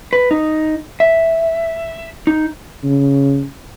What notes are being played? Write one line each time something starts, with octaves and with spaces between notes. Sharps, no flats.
B4
D#4
E5
D#4
C#3